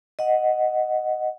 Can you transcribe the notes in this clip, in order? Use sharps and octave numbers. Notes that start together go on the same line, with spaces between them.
D#5 F#5